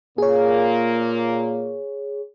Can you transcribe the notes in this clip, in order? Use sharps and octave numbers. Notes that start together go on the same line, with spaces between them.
A#2 A#3 G#4 C#5